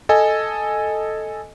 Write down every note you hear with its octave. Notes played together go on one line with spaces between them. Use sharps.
A4 D#5 G#5